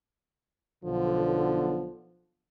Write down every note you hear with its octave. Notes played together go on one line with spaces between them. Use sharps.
B1 D3 F3